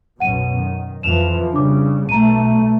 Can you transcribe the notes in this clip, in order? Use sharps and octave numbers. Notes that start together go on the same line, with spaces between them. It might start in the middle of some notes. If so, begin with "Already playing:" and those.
B1 F#2 B2 F#5 D#7
D#3
F2 E3 F3 E7 F7
C#3 G3 D4 D6
B1 B2 A3 A#5 D#7